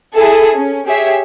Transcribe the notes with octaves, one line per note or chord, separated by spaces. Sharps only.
E4 G#4 A4
C#4
G4 G#4 C#5 E5